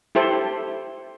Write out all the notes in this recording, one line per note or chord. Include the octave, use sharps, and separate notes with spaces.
E4 G4 A4 C5